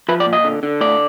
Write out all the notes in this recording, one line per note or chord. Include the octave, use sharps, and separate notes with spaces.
F3 B4
D5
A#2
D#5
D3
D3
A2 D5